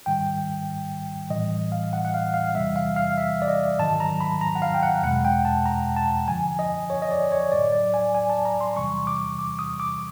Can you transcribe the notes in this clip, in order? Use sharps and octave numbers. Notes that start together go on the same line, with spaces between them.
G#2 D#3 G3 G5
A2 E3 G3 D#5
F5
F#5
F#5
F5
F5
E2 C3 E3 G3 E5
F5
F5
E5
D5
D#5
G#2 D#3 F#3 A5
A#5
B5
A#5
F#5
F5
G5
F#5
E2 B2 G#3 F#5
G5
A5
A#5
A5
F#2 D3 F3 G#5
D#5
C#5
D#5
D5
C#5
A2 F#3 D5
D5
G#5
G#5
A5
A#5
C6
E2 C3 E3 G3 C#6
D6
D6
D#6
D6